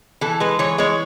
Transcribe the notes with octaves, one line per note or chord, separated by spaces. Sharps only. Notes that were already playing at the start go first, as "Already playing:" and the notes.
E3 A4
G#3 B4
E3 C#5
G#3 C#5